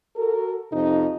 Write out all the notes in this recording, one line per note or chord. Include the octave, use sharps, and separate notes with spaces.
F#4 A4 A#4
F2 C3 D#4